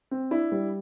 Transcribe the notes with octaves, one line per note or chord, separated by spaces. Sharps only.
C4
D4 E4
G3